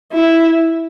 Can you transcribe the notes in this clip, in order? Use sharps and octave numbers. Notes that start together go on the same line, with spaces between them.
E4